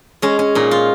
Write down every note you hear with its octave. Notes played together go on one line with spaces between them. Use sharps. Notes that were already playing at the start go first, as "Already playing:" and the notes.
G#3 C#4
C#4
A#2 D#4
F4